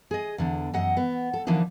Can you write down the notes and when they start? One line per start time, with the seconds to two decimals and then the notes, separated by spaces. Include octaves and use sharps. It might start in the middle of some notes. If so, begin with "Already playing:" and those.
0.11 G#4 D#5
0.38 E2 D3
0.74 F#2 D#5 F#5
0.97 B3
1.33 A4
1.47 D3 E3 F3 A#3 D4 D#4